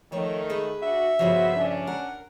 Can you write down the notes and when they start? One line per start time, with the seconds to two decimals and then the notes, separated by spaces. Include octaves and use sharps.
0.12 D#3 F3 A3 C#5
0.50 G#4 B4
0.82 D4 F#4 E5
1.19 G2 C#3 F3 B3 F#4 C5
1.56 C#4 D4
1.87 A#4 F#5